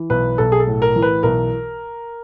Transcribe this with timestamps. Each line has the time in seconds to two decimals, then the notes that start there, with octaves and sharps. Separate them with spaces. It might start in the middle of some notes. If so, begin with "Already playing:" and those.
Already playing: E3
0.10 B1 B4
0.38 B1 A4
0.52 G#4
0.60 A4
0.67 A2
0.82 A#4
0.95 E3
1.02 B4
1.23 B1 A#4